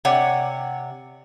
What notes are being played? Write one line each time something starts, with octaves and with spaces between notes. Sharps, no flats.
C3 C#5 D5 F#5